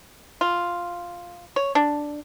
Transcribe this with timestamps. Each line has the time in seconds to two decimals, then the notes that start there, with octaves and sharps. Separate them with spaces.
0.41 F4
1.56 C#5
1.75 D4